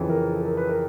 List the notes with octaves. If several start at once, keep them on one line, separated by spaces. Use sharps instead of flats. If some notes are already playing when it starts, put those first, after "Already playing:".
Already playing: F2 C#3 E3
A#4
A4
A#4
B4
A#4